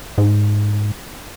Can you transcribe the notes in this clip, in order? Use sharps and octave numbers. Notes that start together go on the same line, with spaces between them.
G#2